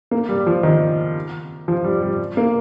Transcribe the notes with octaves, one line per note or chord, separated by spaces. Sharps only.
A#3
G3
F3
D#3
F3
G3
G3
A#3